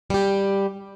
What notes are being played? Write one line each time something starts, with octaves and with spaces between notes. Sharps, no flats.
G3 G4